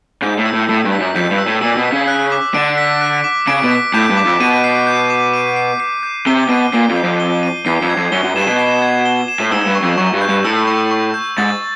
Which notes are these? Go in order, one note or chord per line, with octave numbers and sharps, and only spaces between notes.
G#2 G6
A2
E6
A2
A2 E6
G2
B6
F#2
F2 G6
G2
E6
A2
A#2 E6
B2
B6
C#3
F#6
D6
D3 D7
B6
F#6
D6
C#3 D7
B2
B6
A2 G6
G2
D6
F2
B2 D#7
C7
G6
D6
D#7
C7
C7
G6
C3 G7
B2 D#7
A#2 C7
F2
G6
F2
G7
D#7
E2 C7
F2
G#6
F2
F#2 G7
F#2
G2 E7
B2
C7
G#6
G7
E7
A2
G#2 E6
G2
C#6
F2
F#2 C#6
G2
G6
G2
A2 E6
C#6
C#6
G6
G#2 A6